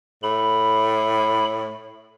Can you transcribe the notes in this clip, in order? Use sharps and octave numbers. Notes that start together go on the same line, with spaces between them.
A2 B5